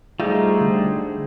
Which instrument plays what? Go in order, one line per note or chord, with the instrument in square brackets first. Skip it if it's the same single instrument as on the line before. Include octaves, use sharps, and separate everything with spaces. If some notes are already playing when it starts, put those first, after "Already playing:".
[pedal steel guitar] G3 A3 D#4 [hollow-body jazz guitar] F4 [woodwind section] G#4 C5
[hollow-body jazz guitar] D3